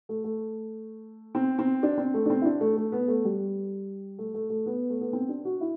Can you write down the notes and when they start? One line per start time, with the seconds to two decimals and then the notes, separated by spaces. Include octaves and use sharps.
0.09 A3
0.24 A3
1.35 C4
1.59 C4
1.83 D4
1.98 C4
2.14 A3
2.26 D4
2.30 C4
2.42 E4
2.45 D4
2.61 A3
2.77 A3
2.92 B3
3.08 A3
3.25 G3
4.19 A3
4.34 A3
4.50 A3
4.66 B3
4.90 A3
5.01 B3
5.13 C4
5.29 D4
5.45 F#4
5.61 E4